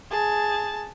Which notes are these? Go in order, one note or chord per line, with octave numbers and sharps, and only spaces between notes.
G#4 A5